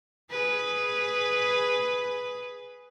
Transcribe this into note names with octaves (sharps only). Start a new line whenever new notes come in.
G#4 B4